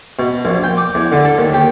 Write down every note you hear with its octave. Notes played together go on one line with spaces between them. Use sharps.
B2
A#1
G5
D6
E2
D3
A4
D#2
G4